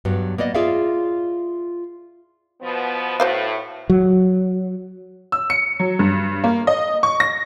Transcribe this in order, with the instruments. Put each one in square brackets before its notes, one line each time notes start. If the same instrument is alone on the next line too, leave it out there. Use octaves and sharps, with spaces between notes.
[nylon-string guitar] G2 F#3 B3
A#3 B3 D5 D#5
F4 G#4 D5 E5 F5
[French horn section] B2 F3 B3
[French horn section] A2 [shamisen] F#4 C5 F5
[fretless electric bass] F#3
[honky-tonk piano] E6
C#7
F#3
G2
A#3
D#5
C#6
A#6